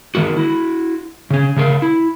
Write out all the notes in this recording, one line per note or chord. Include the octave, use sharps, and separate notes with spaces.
D#3 G#3 A#3 F#4
E4 F#4
C#3 C#4
C#3 A3 A4 A#4 C5 F5
E4